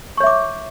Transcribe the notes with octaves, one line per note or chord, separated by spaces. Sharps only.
C#5 E5 C#6 D6